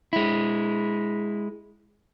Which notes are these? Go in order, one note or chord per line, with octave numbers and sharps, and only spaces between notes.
G#3 E4